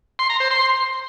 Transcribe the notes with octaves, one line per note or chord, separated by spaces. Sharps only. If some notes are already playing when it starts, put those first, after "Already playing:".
C6
A#5
C5
C6